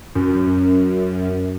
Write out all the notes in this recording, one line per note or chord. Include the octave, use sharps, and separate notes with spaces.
F#2